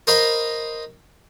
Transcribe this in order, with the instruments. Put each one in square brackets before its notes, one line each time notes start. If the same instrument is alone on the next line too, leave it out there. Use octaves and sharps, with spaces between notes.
[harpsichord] A#4 C5 D#5 F5 B5 C6